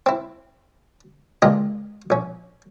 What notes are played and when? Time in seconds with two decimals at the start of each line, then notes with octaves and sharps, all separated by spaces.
0.06 C4 E4
1.42 C#2 A#2 G#3 F4 G4 D#5
2.10 A#1 C#4